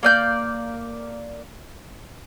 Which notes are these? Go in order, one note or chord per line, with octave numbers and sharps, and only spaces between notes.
A#3 D5 G6